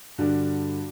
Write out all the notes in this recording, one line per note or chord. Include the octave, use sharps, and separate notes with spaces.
G2 D3 D4 F#4